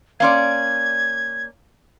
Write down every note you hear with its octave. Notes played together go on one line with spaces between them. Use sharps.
A#3 C#4 D5 F5 C6 G#6